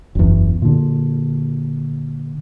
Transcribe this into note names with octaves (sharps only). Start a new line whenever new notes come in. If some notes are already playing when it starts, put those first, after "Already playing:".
F#1 E2
A#2 D3